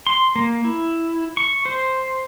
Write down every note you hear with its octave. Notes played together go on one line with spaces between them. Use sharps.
C6
A#3
E4
C#6
C5